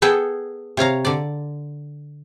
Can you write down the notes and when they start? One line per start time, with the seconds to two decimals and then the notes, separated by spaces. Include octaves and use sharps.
0.02 B3 G#4 A4 G5
0.77 C3 C#5 F5 A#5
1.05 D3 D5